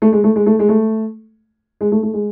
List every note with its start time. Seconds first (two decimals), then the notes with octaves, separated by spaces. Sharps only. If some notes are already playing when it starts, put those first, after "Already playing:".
0.02 A3
0.13 G#3
0.24 A3
0.36 G#3
0.46 A3
0.59 G#3
0.69 A3
1.81 G#3
1.92 A3
2.03 A3
2.14 G#3